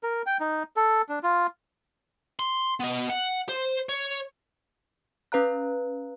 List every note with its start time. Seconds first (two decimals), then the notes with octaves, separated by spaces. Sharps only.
0.03 A#4
0.26 G5
0.40 D#4
0.76 A4
1.09 D4
1.23 F4
2.39 C6
2.80 B3 D#5
3.09 F#5
3.49 C5
3.89 C#5
5.32 C#4 B4 F5 A#5 F#6